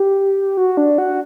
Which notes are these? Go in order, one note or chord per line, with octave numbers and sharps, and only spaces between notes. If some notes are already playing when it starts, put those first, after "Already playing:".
Already playing: G4
F#4
D4
F#4